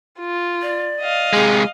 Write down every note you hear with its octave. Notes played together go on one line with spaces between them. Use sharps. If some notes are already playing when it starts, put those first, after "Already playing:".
F4
D5
D#5 F5
C3 G#3 G#4